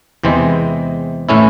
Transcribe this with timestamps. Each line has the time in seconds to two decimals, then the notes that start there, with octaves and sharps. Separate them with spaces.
0.23 E2 C3 E3 G#3 C4
1.29 A2 E3 A3 C#4 E4